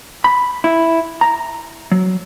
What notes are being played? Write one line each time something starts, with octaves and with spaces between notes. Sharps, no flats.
B5
E4
A#5
F#3